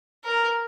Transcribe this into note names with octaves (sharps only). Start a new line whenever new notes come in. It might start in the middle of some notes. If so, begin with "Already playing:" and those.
A#4